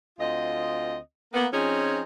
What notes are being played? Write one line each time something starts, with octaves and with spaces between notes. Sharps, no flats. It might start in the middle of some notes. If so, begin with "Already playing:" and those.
D2 C4 F4 D#5
A#3 B3
F3 C4 C#4 D#4 F4 G#4